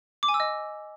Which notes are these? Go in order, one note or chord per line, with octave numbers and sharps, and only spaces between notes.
D6
G#5
E6
D#5